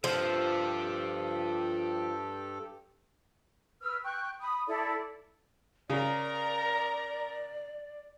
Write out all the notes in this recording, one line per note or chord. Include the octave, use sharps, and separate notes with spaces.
G2 F3 G4 A4 E5
B4 E6 F6
G5 C#6 F#6
B5 D#6
E4 A4 D5
C#3 A#4 D5 A#5